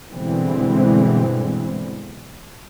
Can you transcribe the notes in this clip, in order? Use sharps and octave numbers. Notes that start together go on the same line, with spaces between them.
G2 B2 D3 E3 G#3 C4